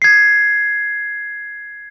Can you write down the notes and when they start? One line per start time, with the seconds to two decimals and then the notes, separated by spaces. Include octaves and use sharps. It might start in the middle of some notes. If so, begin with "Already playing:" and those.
0.02 G#6 C7